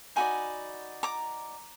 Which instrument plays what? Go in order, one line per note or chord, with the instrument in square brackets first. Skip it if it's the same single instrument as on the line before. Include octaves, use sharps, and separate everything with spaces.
[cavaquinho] D#4 F#4 D5 G#5 B5
A#5 D6